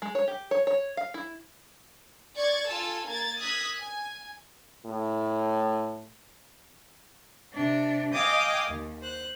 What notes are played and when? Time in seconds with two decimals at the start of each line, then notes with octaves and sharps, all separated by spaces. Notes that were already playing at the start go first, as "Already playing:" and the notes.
0.02 G#3
0.15 C#5
0.28 G4
0.51 C#5
0.67 C#5
0.97 F5
1.14 E4
2.36 D5 C#6 G#6 A6
2.67 F4 A4 G#5 A5 E6
3.07 A#3 A#4 G#6 A6
3.39 D#6 E6 F#6 G#6 A#6 B6
3.80 G#5
4.85 A2
7.53 C3 D4
8.13 D#5 F5 G5 G#5 D6 D#6
8.69 D#2
9.02 C5 F#6